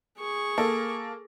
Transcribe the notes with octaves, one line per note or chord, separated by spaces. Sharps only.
G#4 C#6
A#3 A4